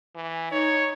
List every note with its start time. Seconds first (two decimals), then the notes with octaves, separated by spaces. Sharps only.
0.15 E3
0.52 D#4 C#5